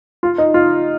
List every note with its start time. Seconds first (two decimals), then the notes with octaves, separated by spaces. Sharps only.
0.23 F4
0.38 D#4
0.54 F4